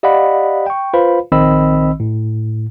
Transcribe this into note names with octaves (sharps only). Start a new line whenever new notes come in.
G4 D5 D#5 F5 F#5 B5
G5 C#6
F4 B4 C5 F5 B5
A#1 D#3 C4 D#5 B5 E6
A2